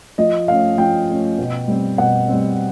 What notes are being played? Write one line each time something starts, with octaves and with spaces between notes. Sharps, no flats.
F3 D#5
A3 C#4 F5
F3 G5
A3 C#4
B2
G3 C4
B2 F#5
G3 C4